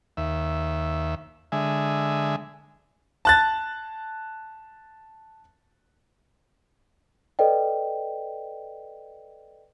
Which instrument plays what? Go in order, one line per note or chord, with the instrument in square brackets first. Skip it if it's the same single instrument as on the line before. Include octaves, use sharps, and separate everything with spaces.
[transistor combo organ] D#2 E5
D3 G#3 E5 G#5
[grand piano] A5 F#6 A6
[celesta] A4 B4 D5 D#5 G5